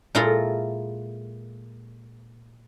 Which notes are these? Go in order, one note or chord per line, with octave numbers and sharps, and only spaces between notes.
A#2 G#3 E4 F4 A4 A#4